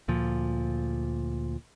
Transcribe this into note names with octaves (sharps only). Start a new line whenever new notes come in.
D2 A#2 F3